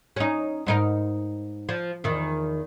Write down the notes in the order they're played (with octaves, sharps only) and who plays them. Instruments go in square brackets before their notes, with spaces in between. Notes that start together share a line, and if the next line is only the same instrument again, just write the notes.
[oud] C#4 D#4
G#2 D#4 A#4
F3
E2 D#3